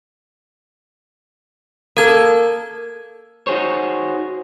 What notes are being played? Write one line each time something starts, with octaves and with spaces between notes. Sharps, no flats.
A#3 A4 A#4 G#6
D#4 F#4 G#4 C5 C#5